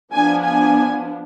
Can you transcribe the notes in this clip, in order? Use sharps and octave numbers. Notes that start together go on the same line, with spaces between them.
F3 B3 D4 G#5
G#5